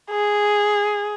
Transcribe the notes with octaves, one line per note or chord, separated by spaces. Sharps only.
G#4